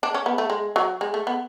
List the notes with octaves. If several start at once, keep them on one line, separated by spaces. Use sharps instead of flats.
D4
C#4
B3
A3
G#3
F#3
G#3
A3
B3